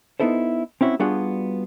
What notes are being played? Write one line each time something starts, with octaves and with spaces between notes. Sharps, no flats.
B3 D#4 E4 A4 C5
C4 C#4 E4 F#4
G3 B3 D4 F4 F#4 G#4